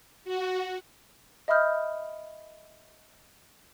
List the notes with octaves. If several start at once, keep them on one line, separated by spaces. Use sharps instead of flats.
F#4
D#5 E5 B5 D#6 F6 G6